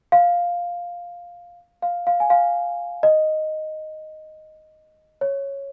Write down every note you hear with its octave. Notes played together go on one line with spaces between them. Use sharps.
F5
F5
F5
G#5
F5
D#5
C#5